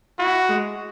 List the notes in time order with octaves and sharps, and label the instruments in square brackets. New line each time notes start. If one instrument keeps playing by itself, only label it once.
[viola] E4 [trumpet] F#4
[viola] G#3